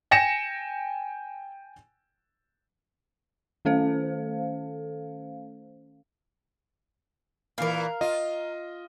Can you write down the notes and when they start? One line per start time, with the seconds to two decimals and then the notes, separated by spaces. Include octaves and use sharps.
0.11 G5 G#5 A#6 C#7 E7
3.65 D#3 A3 C#4 A4 C5 F5
7.58 A#2 E3 A#4 F5
8.01 F4 D#5